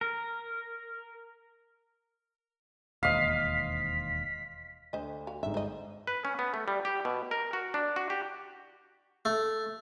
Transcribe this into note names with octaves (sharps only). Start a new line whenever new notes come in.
A#4
E1 D#2 C5 D#5 F5 B6
D2 C5 D#5
F#4 F5
G1 G#2 E5
C5 D#5
B4
C#4
B3
A3
G3
G4
B2
A#4
F#4
D4
F#4
G4
A3